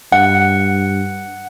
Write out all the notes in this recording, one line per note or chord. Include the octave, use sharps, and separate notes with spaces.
G2 F#5